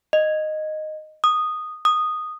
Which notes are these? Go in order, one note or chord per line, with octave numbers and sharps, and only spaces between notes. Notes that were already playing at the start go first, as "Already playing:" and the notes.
D#5
D#6
D#6